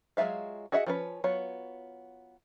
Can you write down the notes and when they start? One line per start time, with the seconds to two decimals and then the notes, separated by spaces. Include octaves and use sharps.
0.17 F#3 G#3 F4 E5 F5
0.72 F#4 G#4 D#5 E5 F#5
0.86 F3 C#4 B4
1.24 F#3 B3 F4 C#5